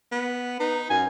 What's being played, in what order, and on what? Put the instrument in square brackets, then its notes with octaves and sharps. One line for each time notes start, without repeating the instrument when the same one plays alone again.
[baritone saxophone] B3
[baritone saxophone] D#4 [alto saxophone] B4
[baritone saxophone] F#2 [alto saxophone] G#5